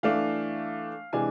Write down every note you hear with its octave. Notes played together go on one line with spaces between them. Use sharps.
E3 A3 D4 F5
C3 E3 G#3 D4 G#5